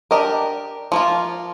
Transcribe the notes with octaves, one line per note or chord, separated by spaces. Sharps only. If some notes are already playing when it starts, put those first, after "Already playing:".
D4 G4 A#4 D#5
F3 A#3 F4